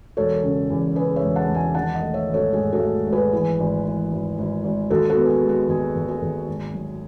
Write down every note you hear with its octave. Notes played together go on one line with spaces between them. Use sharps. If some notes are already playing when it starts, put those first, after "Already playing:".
E1 A4 C#5
C#3
E2
C#3 G#4 B4
C#5 E5
E1
F#5 A5
E1
E5 G#5
D#3 F#5 A5
D#5 F#5
A3
C#5 E5
G#1
A4 C#5
G#2 G#4
F#4 A4
A3
G#1
G#4 B4
E3
G#1
E3
G#1
G#1
G#1
D#2 F#4 A4
F#4 A4
B3
G#4
F#4
G#3
F#4
D#2 G#4
D#2
G#4
D#2
G#1
F#3